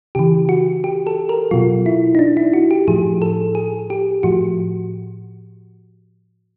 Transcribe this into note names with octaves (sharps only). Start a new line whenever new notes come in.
C#3 E3 G4
F#4
G4
A4
A#4
B2 F#3 F4
E4
D#4
D4
E4
F#4
G4
A2 F3 G#4
A4
G#4
G4
A2 F3 F#4